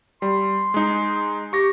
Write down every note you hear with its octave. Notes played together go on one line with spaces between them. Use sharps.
G3 C6
G#3 D#4
G4 C#6 A#6